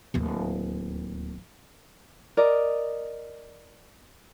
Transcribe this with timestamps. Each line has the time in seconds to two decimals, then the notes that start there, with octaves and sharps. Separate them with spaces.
0.14 D1 D#2
2.37 A#4 D5 D#5